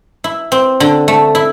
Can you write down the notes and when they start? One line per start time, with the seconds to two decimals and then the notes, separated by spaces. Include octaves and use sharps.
0.24 E4
0.52 C4
0.80 D3
1.08 A3
1.35 E4